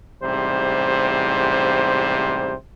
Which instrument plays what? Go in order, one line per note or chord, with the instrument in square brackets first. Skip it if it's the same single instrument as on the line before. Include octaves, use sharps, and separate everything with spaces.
[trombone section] A1 G#2 C3 G3 C5